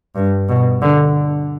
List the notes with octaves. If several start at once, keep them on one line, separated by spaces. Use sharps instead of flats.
G2
B2
D3